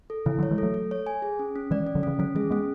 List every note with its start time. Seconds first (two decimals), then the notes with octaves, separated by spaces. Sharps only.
0.10 A4
0.26 C#3 E3 E4
0.38 D3 F#3
0.43 C#5
0.51 E3 G#3
0.58 F#3 A3 A4
0.74 A4
0.91 C#5
1.06 G#5
1.22 G#4
1.39 C#4
1.56 C#4
1.71 E3 G#3 D5
1.87 C#4
1.95 D3 F#3
2.03 C#3 E3 C#4
2.19 D3 F#3 C#4
2.35 E3 G#3 G#4
2.50 G#3 B3 C#4